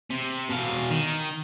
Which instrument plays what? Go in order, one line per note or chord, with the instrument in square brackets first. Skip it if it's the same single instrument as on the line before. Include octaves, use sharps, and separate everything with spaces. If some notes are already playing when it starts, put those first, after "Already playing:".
[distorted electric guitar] C3
B2 F5
D#3